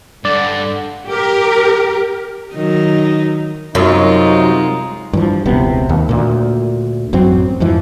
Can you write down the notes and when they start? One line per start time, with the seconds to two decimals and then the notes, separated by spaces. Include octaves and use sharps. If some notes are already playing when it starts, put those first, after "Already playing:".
0.25 G2 D3 D5
1.07 G4 A#4
2.54 D#3 F#3 D#4
3.75 F#2 C3 F#3 G#3 D#4 F4
5.13 G2 E3 F3
5.46 E1 C#2 C3 B3
5.89 D#2
6.09 D2 A#2
7.13 A1 F#2 F#3 C4
7.60 F2 G#2 E3 F3